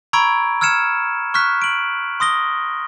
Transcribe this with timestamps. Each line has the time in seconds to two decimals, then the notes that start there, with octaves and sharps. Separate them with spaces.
0.13 A#5 B5 C#6 E6 G#6 D7
0.61 E6 F6 G#6 C#7 E7
1.34 C#6 F6 F#6 B6
1.62 D7 F#7
2.20 C6 D#6 A#6 G7